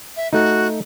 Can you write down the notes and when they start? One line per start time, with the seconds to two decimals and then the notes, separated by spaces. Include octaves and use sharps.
0.17 E5
0.33 A3 D#4 F#4